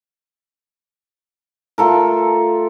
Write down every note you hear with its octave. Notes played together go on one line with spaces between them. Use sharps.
A3 F4 A4 A#4